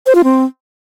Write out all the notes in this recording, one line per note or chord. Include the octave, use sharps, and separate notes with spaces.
C5
F4
C4